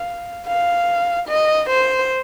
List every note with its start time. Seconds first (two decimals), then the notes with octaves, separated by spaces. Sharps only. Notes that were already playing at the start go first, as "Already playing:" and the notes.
Already playing: F5
0.47 F5
1.27 D#5
1.69 C5